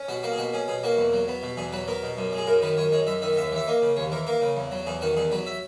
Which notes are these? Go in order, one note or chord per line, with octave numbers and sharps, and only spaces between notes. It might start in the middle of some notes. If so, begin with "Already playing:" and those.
Already playing: C#4
B2 F#4
A#3 F#4
G#4
B2 F#4
C#4 G#4
B2 G#4
A#3 F#4
E2
F#3
B3
B2
E2 G#4
F#3 B4
B3 A#4
B2
F#2
G#3
G#4
F#2 A#4
D#3 B4
F#2 C#5
G#3 C#5
F#2 E5
D#3 E5
D#5
D#2 E5
E3 E5
A#3 D#5
C#3
D#2 C#5
E3 A#4
A#3 A#4
C#3
E2
F#3
E2 G#4
D#3 F#4
E2 G#4
F#3 B4
E5